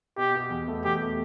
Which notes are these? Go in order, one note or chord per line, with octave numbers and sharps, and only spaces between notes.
B2 G4
B2
E2
A3
E2 G4
A3